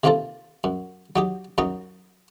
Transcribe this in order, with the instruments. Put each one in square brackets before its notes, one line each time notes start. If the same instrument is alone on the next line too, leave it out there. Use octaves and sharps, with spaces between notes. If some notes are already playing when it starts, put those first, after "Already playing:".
[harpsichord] C3 D#3 A#3 C4 F4 A4
F#2
F#3 D#4 G4
F#2 F#3 D#4 A#5